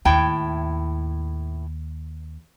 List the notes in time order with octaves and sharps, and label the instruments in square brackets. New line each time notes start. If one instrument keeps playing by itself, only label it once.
[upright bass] D#2 [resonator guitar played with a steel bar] A2 E4 G5